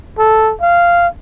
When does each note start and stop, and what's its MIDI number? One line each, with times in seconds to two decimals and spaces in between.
0.18 0.53 69
0.61 1.08 77